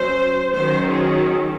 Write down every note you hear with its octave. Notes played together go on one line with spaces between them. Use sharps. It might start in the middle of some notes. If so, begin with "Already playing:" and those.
Already playing: F#3 C#4 C5
D#3 F#3 C#4 C5
G#4